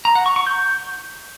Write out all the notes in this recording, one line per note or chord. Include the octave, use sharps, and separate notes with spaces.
A#5
F#5
C#6
C#6
G6